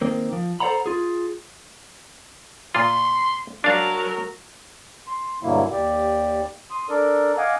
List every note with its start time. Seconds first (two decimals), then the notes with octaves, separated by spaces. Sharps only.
0.01 D#3 A#3 C4
0.33 F3
0.60 A4 C5 D5 F#5 A#5 B5
0.86 F4 G#4
2.75 A#2 F4 C6
3.64 F#3 D4 A#4 F5 A5
5.07 C6
5.43 G2 B2 D3 F#3 A#3 E4
5.72 D#2 G4 D5
6.71 C6 D#6
6.89 D4 A4 A#4 D5
7.37 D#5 F5 F#5 G#5 D6